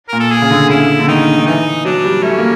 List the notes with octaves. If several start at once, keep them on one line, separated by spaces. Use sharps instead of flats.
A#2 A#4
A4
G#4
C#3
D3
C#3 E4
D3
D#3 D#4
D#3
E3 D#4
F#3 D4
G3
A3 C#4
A#3